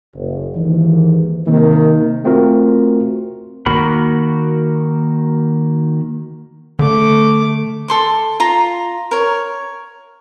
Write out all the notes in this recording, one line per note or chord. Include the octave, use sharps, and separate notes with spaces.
F#1
D#2 G#2 D#3 E3
C3 D#3 A#3
A3 C4 F4 F#4 A#4
D#3 A#3 F#4 A#4 B5
D3 A3 D6
A4 C6 D6
F4 A#5 C6
A#4 C#5